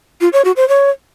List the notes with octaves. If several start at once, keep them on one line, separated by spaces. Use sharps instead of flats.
F4
C#5
F#4
C5
C#5